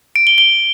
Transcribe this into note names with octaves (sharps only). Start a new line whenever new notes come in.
D7
G7
G7